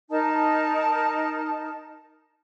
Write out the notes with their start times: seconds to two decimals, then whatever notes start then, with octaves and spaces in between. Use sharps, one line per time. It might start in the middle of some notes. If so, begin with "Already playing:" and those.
0.10 D#4 A#4 A5